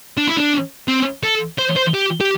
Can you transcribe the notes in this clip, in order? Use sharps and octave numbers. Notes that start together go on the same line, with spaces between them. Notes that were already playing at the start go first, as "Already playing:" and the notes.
D4
E4
D4
C4
A4
C5
C5
G4
G4